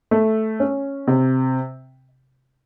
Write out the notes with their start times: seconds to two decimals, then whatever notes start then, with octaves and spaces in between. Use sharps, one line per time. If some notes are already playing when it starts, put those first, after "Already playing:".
0.11 A3
0.60 C#4
1.07 C3